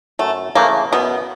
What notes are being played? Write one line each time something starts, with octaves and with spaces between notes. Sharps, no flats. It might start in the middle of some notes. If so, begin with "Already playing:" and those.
F#2 A3
C#3 E3 A3 A#3
F#2 B2 B3